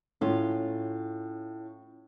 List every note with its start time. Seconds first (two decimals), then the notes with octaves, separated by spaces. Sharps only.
0.21 A2 C#4 F4